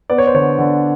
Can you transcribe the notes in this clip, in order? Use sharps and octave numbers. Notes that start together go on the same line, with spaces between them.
B3 D5
C#5
C5
D3 C#5
D3